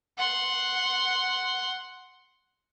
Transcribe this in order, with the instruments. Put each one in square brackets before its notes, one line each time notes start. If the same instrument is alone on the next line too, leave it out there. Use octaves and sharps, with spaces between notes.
[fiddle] F#5 C6